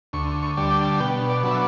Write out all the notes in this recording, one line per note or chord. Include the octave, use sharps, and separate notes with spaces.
D2 C#6
C#6
D3 G3 D4
G5
B2 G5
D5
F#3 B3 D4
E5